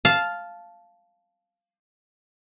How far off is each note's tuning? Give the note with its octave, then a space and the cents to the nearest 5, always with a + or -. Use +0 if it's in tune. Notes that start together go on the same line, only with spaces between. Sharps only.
F5 +0 A5 -10